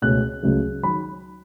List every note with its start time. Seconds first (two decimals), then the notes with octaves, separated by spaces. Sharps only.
0.02 C#2 B2 A3 C#4 F#6
0.43 C#2 C#3 F#3 A3
0.83 D#3 F#3 B5